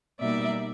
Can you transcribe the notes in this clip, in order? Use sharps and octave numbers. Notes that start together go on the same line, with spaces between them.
B2 G3 A#3 D#4 D5 E5